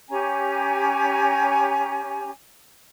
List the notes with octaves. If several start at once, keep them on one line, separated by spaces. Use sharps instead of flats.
C#4 G4 G#5 A#5